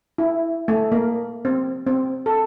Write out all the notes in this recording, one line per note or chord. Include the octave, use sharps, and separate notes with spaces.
E4
A3
A#3
C4
C4
A4